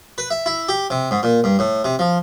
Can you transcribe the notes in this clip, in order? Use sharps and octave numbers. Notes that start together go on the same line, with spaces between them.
B4
E5
E4
G4
C3
G#2
A#2
G2
A2
C3
F3